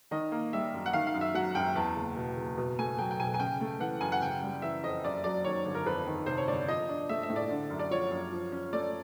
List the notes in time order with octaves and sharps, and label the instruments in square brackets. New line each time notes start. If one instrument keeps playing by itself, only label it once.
[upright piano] D#3 D#5
A#3
G3 E5
F#2
F#5
D#3 F5
F5
F#2
E5
F#3 F#5
F#2 G5
E2 A5
F#1
B2
F#1
B2
A3 G#5
F#3 G5
G5
B1 G#5
G#5
C#3 G5
A3
E3 F#5
F#2 G#5
F#5
C#3 G5
G3
E3 E5
F2 D#5
F#2 D5
F#3 D5
D#3 C#5
G1
A#4
F2 B4
D#3
C3 C5
C#5
G1 D5
F3 D#5
D4
A3 E5
E5
A2
D5
D3
F#2
D5
F3 C#5
F#2
F3
C#4
A3 D5